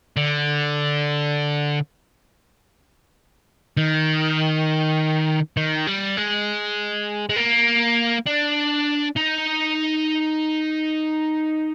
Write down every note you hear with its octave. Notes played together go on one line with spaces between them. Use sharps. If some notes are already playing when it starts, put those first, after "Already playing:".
D3
D#3
D#3
G3
G#3
G#3
A#3
D4
D#4